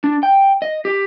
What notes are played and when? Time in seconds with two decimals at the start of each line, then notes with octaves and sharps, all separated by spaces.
0.04 D4
0.23 G5
0.62 D#5
0.85 G4